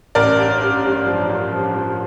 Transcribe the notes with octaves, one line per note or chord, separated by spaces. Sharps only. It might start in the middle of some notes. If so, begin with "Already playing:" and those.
A1 A#4 D5
G2
G2
G2
F3
G2
F3
F3